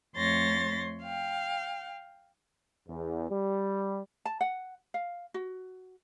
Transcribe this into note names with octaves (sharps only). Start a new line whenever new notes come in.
F2 A3 C#5 C6 A6 A#6
F5 G5
E2
G3
A5
F#5
F5
F#4